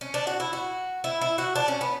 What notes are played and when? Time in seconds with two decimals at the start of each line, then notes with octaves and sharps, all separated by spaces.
0.01 C#4
0.14 D4
0.27 F#4
0.40 E4
0.53 F#4
1.04 E4
1.21 E4
1.38 F#4
1.56 D4
1.68 C#4
1.81 B3